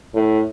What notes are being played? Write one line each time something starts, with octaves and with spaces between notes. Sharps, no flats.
A2